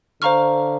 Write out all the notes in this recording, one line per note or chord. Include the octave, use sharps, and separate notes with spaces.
D3 C5 F5 A#5 C#6 F6